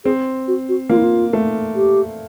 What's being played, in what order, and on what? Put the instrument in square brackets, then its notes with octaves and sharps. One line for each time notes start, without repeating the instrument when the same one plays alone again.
[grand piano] C4 [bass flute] G#4
[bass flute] F#4
F#4
[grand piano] A#3 [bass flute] F4
[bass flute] E4
F4
[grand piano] A3
[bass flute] G4